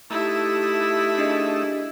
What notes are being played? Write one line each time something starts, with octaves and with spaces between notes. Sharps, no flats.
A3 D#4 E4 G4 E5
D4 G#4 D#5